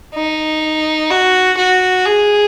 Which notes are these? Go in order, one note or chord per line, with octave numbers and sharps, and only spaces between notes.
D#4
F#4
F#4
G#4